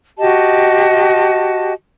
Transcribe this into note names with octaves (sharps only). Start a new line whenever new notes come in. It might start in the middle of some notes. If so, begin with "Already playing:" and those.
F#4 G4 D#5 A5